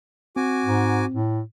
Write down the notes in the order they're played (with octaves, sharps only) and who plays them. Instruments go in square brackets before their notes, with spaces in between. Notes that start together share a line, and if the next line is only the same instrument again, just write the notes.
[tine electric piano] C4 [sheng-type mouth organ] F#4 G#5 D6
[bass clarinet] G#2
A2